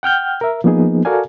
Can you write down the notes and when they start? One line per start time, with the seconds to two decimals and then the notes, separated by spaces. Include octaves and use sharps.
0.03 F#5 G5 F6 G6
0.41 A#4 E5
0.64 F3 A#3 B3 D#4 G#4
1.05 F#4 A4 A#4 D5 F5 G#5